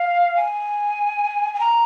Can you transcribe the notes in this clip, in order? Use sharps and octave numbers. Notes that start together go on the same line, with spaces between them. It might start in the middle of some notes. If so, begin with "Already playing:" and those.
Already playing: F5
G#5
G#5
A#5